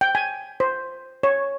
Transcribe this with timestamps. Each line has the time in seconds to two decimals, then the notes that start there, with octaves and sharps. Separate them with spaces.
0.01 G5
0.15 G#5
0.60 C5
1.23 C#5